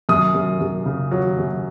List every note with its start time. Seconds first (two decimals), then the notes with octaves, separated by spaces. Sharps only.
0.09 F#2 D#6
0.35 F#2
0.60 F#2
0.86 C#3
1.11 F#3
1.38 F#2